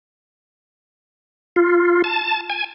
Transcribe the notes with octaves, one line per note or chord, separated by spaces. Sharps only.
F4
A5
G#5